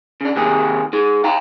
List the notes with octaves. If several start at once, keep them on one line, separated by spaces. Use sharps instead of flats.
C#3 D4
C3 D#3 A#3 G4 G#4
D#4 G#4
F5 G5 A#5